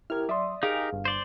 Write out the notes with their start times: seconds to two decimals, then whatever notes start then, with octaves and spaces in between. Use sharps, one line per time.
0.10 E4 G4 A#4 F6 G#6
0.29 F#3 D5 E5 C6 D#6
0.63 D#4 G4 G#4 A#4 F5
0.92 G1
1.05 C5 D5 C6